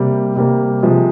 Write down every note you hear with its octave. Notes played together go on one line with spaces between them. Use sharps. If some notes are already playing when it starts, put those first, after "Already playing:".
Already playing: C3 G3 A#3
C3 G3 A#3
C3 F3 G#3